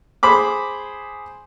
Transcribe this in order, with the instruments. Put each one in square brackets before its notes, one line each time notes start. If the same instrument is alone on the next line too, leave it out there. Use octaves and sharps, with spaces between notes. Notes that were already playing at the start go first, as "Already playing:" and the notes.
[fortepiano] G#4 C5 B5 D6